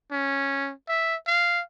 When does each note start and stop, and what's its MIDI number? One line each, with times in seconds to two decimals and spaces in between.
0.11 0.72 61
0.88 1.15 76
1.27 1.62 77